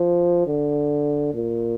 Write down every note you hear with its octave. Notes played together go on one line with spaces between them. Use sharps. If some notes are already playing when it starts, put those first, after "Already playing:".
Already playing: F3
D3
A#2